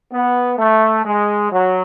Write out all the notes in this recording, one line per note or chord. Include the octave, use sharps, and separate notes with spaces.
B3
A3
G#3
F#3